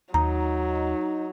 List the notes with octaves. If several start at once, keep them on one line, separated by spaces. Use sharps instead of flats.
D#2 F#3 D#4 A#5